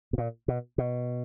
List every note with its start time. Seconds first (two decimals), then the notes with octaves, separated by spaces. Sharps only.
0.13 B2
0.18 A#2
0.48 B2
0.78 B2